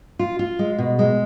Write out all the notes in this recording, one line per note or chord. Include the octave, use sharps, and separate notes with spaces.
F4
F4
G#3
B2
G#3